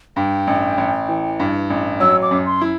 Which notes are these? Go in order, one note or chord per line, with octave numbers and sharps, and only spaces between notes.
G2 G5
A1
A1
E3
G2
A1
F#3 E6
D6
F#2
C6
E4